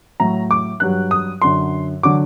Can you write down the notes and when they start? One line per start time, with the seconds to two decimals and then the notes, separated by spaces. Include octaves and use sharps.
0.20 A2 F#3 A#5
0.51 D6
0.80 G2 F#3 F#6
1.11 D#6
1.42 F#2 D3 F#3 C6
2.03 D3 F#3 D6